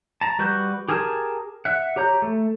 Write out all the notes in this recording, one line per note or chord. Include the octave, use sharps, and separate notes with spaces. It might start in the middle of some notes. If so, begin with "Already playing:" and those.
A5 A#5
G3 F#4 B4 G6
G4 G#4 A#4 G#5 A5
E5 F#5
G4 C#5 A#5 G6
A3